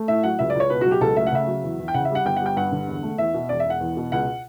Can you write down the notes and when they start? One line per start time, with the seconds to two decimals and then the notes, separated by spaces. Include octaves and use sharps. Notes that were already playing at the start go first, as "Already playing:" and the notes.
Already playing: A3
0.08 A2 E5
0.23 F#3 F#5
0.39 C#2 E5
0.50 D5
0.55 C#2
0.60 C#5
0.70 B2 B4
0.81 F#4
0.86 F#3
0.91 G4
1.01 C#2 A4
1.17 A3 E5
1.27 F#5
1.32 C#3 E5
1.47 F#3
1.63 E2
1.79 E2
1.88 G5
1.94 C#3 F#5
2.05 E5
2.10 G3 F#5
2.25 G1 G5
2.36 G3 F#5
2.46 G5
2.56 G2 F#5
2.72 D3
2.88 E1
3.03 A3
3.18 E2 E5
3.34 B2
3.49 E1 D5
3.60 E5
3.65 E1
3.70 F#5
3.80 E2
3.97 B2
4.12 C#2 F#5